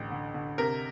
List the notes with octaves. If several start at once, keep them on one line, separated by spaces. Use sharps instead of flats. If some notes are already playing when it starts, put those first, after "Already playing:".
Already playing: A1 D2 D3
D3
D3
C3 A#4